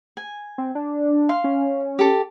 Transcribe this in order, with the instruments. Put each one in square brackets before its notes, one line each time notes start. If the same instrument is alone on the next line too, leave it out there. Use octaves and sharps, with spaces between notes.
[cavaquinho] G#5
[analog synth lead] C4
D4
[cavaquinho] F5 C6
[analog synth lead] C#4
[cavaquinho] G4 A4